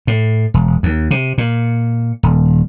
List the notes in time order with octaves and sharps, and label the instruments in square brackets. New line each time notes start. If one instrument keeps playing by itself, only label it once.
[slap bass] A2
E1
D#2
C3
A#2
D#1